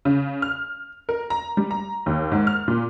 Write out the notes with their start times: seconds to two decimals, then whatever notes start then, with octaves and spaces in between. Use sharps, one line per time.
0.05 C#3
0.42 F6
1.09 A#4
1.30 A#5
1.57 G3
1.71 A#5
2.06 D#2
2.32 G#2
2.47 F6
2.68 A#2